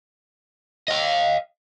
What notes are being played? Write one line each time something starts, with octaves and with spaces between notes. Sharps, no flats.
D#5 F5